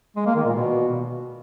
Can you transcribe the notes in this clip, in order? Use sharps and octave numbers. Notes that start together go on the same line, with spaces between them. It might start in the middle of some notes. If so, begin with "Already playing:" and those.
G#3
A#3
D#3
A#2
B2